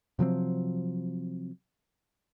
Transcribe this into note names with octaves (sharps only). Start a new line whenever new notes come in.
C3 F3 F#3 C4